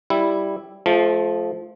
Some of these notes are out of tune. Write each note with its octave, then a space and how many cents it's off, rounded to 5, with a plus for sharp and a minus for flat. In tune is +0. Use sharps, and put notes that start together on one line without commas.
G3 +0 E4 +0
F3 +0 A3 -35